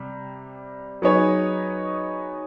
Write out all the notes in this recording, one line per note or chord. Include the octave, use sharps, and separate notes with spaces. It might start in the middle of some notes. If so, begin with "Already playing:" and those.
Already playing: C3 G3
F#3 B3 D#4 G#4 C#5